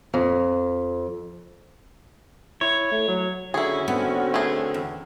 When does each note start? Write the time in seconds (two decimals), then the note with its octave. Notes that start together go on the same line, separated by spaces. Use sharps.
0.14 F2
2.61 E4 C#5
2.92 A3
3.08 F#3
3.54 D3 C#4 E4 F#4 G#4 C#6
3.88 D3 B3 C4
4.34 A3 G#4
4.74 E2